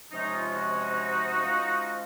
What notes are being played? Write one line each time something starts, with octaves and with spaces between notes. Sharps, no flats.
C3 F3 G#3 C#4 D#4
F4
D#4 F#4
F3 G#3 C#4